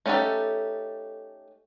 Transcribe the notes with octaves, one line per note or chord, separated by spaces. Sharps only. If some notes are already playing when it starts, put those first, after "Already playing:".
A3 C#4 D#4 G4 A4